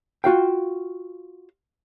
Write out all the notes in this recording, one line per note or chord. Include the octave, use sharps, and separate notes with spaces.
F4 F#4 F5 G5